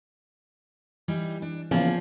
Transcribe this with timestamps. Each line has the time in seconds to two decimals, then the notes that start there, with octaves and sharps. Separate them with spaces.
1.08 E3 G3 D#4
1.42 D4
1.71 C#3 E3 F3 A#3 B3 G#4 D5